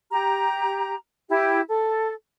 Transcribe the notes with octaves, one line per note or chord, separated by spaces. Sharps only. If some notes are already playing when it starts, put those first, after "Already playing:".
G4 A#5
E4 G4
A4